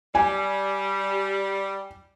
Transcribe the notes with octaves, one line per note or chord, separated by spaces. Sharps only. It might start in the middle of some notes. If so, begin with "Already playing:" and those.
G3 G#5